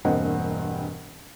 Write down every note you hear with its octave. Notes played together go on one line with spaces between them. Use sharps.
E1 G2 A#3 C4 D#5 F#5